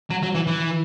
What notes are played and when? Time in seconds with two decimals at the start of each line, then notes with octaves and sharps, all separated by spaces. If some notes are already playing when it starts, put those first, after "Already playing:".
0.10 F#3
0.23 F#3
0.35 E3
0.47 E3